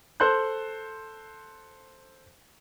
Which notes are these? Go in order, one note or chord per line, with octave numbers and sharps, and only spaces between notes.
A4 C5 C6 F#6 G6